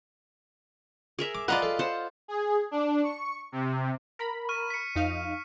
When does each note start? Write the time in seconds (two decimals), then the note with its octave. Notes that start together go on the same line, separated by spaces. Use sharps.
1.19 G#4 A#4 E5
1.35 D6
1.48 F4 B4 D5 D#5 F5 F#5 A#5 B5
1.62 A4
1.79 C5 F#5 A5
2.28 G#4
2.71 D4
3.03 C#6
3.52 C3
4.19 A#4 A#5 B5
4.49 C#6 F6 D#7
4.70 B6 C#7
4.95 F2 D#4 F5